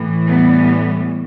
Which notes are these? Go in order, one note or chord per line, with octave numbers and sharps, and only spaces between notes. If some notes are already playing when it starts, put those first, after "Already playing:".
Already playing: A2 E3
G3 B3